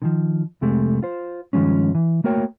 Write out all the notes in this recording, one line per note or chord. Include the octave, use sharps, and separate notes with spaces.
D3 D#3 F3
C2 F2 C3 G#3 A3 G4
F4 C5
G2 D#3 F3 G#3 C#4
E3
A3 A#3 F#4 A#4 C#5 G5